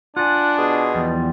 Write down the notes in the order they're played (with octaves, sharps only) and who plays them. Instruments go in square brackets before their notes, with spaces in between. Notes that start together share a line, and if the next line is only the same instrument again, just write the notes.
[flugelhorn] D4 [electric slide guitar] F4 D5 G#5 [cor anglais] F#5
[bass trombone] B2 [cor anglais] G#4
[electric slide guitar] E2 F3 G3